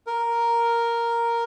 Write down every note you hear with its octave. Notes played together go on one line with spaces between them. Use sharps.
A#4